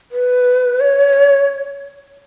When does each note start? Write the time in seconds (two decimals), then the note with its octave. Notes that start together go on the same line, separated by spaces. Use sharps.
0.12 B4
0.80 C#5